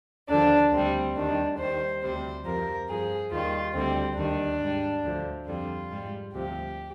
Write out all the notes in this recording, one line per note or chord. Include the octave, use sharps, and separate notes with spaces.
D#2 D3 F3 D4
D2 C3 G3 C4
D#2 D#3 G3 D4
D#2 D#3 G3 C5
D2 C3 G3 C5
F2 C3 F3 A#4
G2 F3 G#4
D#2 D#3 G3 F4
D2 D3 G3 C4
D#2 D#3 G3 D4
G#2 G3
D2 D3 F3
F2 D3 G3 F4
G#2 G3
D2 C3 F3 G4